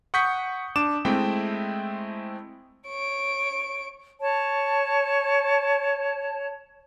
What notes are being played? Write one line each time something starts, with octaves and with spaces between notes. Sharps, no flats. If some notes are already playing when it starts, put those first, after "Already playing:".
F#5 C#6 D#6 G6 B6 C#7
D4 D6 E7
G#3 A3 C4 E4 G5
C#5 D7
C#5 A5